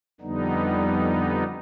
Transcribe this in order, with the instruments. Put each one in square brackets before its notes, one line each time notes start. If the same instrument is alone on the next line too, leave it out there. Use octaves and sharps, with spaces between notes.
[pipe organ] F2 D3 G3 B3 D#4